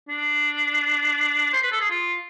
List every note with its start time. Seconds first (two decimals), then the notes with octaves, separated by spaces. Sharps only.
0.09 D4
1.53 C5
1.62 B4
1.72 A4
1.81 G#4
1.90 F4